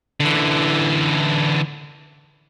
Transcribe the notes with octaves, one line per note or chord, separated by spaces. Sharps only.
D3 E3